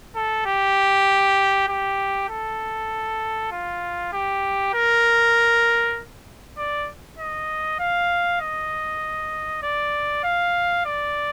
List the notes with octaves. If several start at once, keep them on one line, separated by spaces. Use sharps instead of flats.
A4
G4
G4
A4
F4
G4
A#4
D5
D#5
F5
D#5
D5
F5
D5